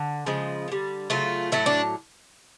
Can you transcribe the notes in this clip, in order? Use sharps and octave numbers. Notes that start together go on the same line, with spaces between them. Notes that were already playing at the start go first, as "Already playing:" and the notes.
Already playing: D3
C#3 F3 G#3
D3 G3
C#3 F#3 A3 F4
A2 F#3 A3 E4
D4